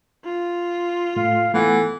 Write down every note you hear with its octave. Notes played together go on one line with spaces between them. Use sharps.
F4
A2 A3 F5
E3 A3 B3 A4 F#5